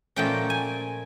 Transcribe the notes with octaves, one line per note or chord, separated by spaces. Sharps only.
A#2 F3 A3 C#4 G5
G#5